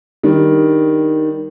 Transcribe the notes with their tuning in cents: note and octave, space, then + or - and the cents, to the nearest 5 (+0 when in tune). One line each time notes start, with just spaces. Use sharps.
D#3 +0 G3 +0 D4 +0